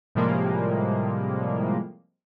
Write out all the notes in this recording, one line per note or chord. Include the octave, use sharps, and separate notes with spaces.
A2 C3 F3 G3 G#3 A#3